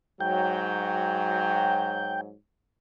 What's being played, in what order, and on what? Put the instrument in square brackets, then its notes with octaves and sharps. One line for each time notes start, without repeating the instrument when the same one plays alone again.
[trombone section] G#2 F#3 [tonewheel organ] G5